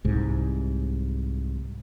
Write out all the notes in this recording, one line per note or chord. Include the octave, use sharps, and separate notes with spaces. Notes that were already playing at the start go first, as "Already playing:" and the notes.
C2 G#2